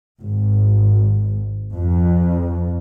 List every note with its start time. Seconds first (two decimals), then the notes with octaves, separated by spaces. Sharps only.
0.20 G#1
1.74 F2